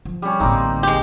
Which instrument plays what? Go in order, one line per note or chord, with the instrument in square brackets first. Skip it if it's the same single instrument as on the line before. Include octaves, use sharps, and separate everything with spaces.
[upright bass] F3
[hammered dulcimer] G3 C#4
[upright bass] A1 D2 [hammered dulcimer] A#3 C4 D#4
[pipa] G#3 G4